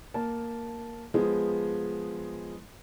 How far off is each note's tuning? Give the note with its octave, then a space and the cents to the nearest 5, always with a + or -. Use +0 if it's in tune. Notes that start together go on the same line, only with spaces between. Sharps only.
A#3 +0 A5 -5
F3 +0 G#3 -5 B3 +0